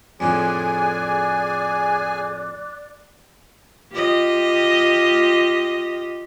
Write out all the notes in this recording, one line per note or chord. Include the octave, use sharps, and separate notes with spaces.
F2 A2 D3 G#4 D5 G#5 D6 F#6
F4 G4 D#5